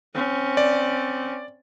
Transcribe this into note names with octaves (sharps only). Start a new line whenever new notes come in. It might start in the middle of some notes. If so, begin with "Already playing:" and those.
C4 C#4
D5